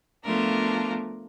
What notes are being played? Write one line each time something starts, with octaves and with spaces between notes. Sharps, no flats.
F3 A3 B3 D4 F4 A#4